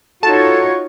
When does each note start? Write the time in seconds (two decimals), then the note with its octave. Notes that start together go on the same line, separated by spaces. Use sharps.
0.23 D#4 F4 F#4 A4 C#5 A5